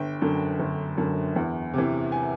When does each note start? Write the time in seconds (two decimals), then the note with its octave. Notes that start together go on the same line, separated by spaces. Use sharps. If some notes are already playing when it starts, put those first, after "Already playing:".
Already playing: G1 G5
0.22 F#2 D3
0.60 G1
0.98 F#2 D3
1.36 E2
1.74 C3 E3
2.12 G#5